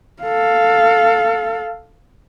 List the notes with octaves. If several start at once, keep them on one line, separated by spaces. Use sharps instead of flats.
A4 F5